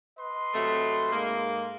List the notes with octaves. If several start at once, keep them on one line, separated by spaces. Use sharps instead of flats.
B4 D#5 C6
C3 F#3 A3
G#2 G#3 A#3